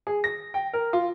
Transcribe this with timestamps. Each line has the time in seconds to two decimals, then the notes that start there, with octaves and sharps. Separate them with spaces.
0.07 G#4
0.24 A#6
0.54 G5
0.73 A#4
0.93 F4